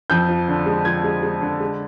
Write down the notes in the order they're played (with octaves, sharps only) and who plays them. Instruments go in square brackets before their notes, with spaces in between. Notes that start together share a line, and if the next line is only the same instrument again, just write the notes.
[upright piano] F2 G6
F3
D3
G#3
F3 G#6
G#3
G#3
D3
G#3